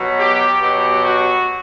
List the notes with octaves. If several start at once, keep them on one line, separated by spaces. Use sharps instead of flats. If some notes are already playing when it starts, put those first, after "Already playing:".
Already playing: B2 F#3
G4
B2 F#3 G4
F#4